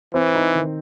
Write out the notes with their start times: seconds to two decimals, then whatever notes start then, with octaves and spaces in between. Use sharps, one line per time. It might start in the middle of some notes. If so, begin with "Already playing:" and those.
0.14 E3 C4
0.35 D#4
0.55 D#3